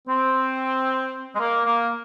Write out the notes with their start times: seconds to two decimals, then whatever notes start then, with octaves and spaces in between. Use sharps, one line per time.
0.08 C4
1.35 G#3
1.40 A#3
1.65 A#3